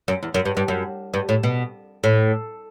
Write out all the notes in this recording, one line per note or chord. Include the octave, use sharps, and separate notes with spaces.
F#2
E2
F#2
G2
G2
F#2
G2
A2
B2
A2